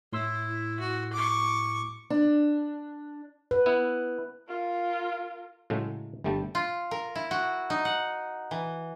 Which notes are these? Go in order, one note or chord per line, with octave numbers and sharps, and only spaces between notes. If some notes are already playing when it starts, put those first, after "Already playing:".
A2 E4 C6 E6
F#4
C#6 D6
D4
B4
B3 E4
F4 A#4
A2 C#3 F#3 G#3 A3
G1 D3 G3 A3 G5 A5
F4
A#4
E4
F#4
D#4
F#5
E3